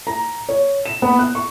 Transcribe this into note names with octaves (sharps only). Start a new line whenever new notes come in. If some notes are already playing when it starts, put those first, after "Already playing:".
A#5
C#5
E7
B3
F#6
C#6